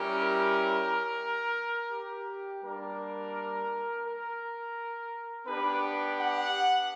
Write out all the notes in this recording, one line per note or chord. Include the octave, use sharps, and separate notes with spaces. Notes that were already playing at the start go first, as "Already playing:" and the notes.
Already playing: G3 C#4 E4 G4 A#4
G4
G3 A#3 D4 A#4
A#4
B3 D4 G4 B4
F#5